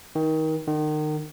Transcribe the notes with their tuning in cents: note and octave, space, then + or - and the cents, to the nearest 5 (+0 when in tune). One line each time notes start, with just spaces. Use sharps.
D#3 +25
D#3 -30